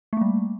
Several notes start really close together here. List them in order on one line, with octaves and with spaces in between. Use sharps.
A3 A#3 G3